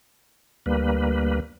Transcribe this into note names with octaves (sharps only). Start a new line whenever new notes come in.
D2 G3 A#3 B4